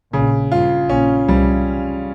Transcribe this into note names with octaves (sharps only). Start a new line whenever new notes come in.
A#1 A#2 C#3
G2 F4
A#1 A#2 C#4
C2 C3 G3